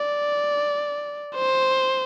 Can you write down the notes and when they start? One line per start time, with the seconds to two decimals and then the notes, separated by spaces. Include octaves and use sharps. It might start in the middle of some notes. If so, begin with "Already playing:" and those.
Already playing: D5
1.35 C5